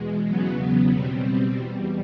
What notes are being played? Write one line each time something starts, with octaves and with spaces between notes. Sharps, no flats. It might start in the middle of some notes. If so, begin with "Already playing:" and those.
Already playing: E2 B2 G#3
E2 C#3 F#3 B3
B2 G3 C4
E2 B2 G3